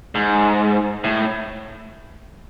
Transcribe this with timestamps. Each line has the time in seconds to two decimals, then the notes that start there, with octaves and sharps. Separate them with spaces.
0.15 G#2
1.04 A2